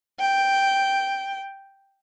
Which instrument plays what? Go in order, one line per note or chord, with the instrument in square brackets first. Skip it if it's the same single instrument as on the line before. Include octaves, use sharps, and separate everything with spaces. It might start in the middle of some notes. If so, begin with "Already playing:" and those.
[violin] G5